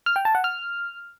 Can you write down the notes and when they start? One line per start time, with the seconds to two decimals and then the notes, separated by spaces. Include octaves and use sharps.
0.06 F6
0.16 G5
0.25 A5
0.35 F#5
0.44 F6